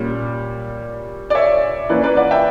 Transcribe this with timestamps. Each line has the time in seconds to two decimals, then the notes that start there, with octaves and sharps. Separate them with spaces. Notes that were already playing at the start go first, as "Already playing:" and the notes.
Already playing: A#2 G3 C#4
1.30 D5
1.35 C#5 E5
1.89 E3 A#3 C#4 B4 D5
2.03 B4 D5
2.17 D5 F#5
2.31 E5 G5